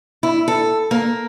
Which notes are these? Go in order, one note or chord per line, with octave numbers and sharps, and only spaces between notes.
E4
A4
A#3